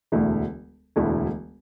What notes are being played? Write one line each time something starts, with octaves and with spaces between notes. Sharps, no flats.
E1 D2 D3 A3 E4
E1 D2 D3 A3 E4